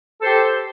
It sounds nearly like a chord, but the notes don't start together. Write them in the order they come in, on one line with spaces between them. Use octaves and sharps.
A4 C5 G4